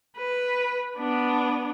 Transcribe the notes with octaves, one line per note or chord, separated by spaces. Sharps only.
B4
B3 D4